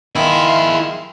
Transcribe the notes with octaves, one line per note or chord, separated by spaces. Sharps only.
D#3 E4 G#4 E5 F5 C6